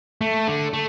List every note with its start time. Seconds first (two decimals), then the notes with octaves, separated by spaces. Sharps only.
0.21 A3
0.47 D3
0.73 A3